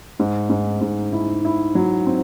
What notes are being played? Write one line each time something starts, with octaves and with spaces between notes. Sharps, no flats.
G#2
G#2
G#2
E4
E4
F#3
C4